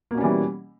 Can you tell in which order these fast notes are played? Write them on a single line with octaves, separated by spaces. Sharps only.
A#3 B2 C#4 G3 E3